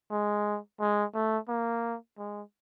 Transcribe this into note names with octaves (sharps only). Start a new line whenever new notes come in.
G#3
G#3
A3
A#3
G#3